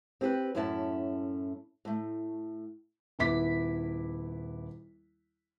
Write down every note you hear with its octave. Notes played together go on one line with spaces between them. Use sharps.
C4 G4 G#4 B4
F#2 A2 C#4 E4 G4 A5
A2 A3
D#1 B3 E4 D6 B6